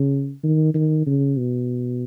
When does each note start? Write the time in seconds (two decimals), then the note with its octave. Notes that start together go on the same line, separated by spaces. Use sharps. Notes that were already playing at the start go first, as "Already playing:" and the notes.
Already playing: C#3
0.43 D#3
0.74 D#3
1.06 C#3
1.37 B2